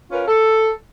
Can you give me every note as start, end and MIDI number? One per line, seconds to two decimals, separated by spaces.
0.12 0.23 61
0.12 0.23 65
0.12 0.23 70
0.12 0.23 71
0.28 0.71 69